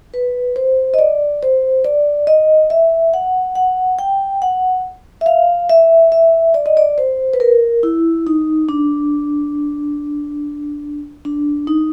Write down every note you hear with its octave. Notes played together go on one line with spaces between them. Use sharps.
B4
C5
D#5
D5
C5
D5
D#5
E5
F#5
F#5
G5
F#5
E5
F5
E5
E5
D5
D#5
D5
C5
B4
A#4
E4
D#4
D4
D4
D#4